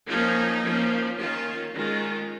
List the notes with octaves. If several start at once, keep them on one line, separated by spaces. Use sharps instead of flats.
F3 A#3 C#4 D#4
F3 A#3 C#4
D#3 C#4 F4
D#3 G#3 C#4 F4